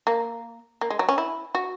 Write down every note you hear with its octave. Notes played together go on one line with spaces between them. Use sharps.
A#3
A#3
G#3
F#3
C#4
E4
F#4